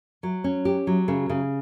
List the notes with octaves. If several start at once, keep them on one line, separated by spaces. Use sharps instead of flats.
F#3
C#4
G4
F#3
C#3
C#3